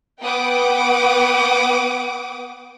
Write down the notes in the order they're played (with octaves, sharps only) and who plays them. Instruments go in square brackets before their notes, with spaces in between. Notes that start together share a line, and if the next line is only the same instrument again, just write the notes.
[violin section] B3 B4 F#5 G5 D6 D#6